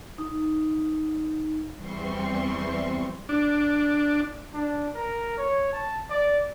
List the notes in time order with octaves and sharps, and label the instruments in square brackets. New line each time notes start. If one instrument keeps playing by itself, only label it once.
[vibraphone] D#4
[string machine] E2 E3 G3 C4 C6 C#6
[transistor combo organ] D4
[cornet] D4
A#4
C#5
A5
D5